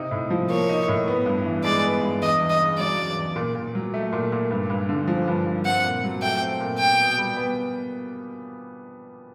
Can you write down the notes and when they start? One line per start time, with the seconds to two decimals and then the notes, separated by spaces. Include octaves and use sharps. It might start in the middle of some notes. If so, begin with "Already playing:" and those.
Already playing: C3 D#4
0.11 A2
0.30 F3
0.50 A#3 C#5
0.69 D#4
0.88 A2
1.08 B3
1.26 G2
1.45 E3
1.64 G#3 D5
1.84 B3
2.02 G2
2.21 E2 D#5
2.40 E2
2.50 D#5
2.59 C#3
2.78 F#3 D5
2.98 E2
3.17 E2
3.36 A#2
3.55 A#2
3.75 F#3
3.94 A3
4.12 A#2
4.32 A#2
4.51 G2
4.70 G2
4.89 D3
5.08 F3
5.28 G2
5.46 G2
5.65 C4 F#5
5.84 A#2
6.04 F#3
6.22 A3 G5
6.41 C4
6.60 A#2
6.79 B2 G5
6.99 B2
7.18 G3
7.36 B3